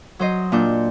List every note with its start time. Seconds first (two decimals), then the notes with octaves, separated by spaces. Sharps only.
0.19 F#3 C5 D#5
0.52 A#2 D4 G6